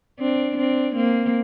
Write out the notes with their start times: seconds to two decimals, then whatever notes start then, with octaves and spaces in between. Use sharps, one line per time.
0.20 C4 D4
0.57 C4 D4
0.96 A#3 C4